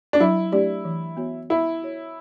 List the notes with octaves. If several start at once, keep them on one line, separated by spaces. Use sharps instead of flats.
D4
F#3 E4
A3 D4 G4 D5
E3
B3 F#4 C#5
B3 E4
F#4 C#5